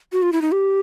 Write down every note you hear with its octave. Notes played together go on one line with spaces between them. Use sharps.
F#4
F4
E4
D#4
G4